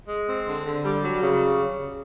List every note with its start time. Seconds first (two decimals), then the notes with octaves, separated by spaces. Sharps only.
0.09 G#3
0.28 C4
0.48 D3
0.66 D3
0.84 G3
1.04 F#3
1.22 C#3